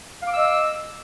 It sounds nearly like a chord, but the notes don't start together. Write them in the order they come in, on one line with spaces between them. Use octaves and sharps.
F5 D6 E6 D#5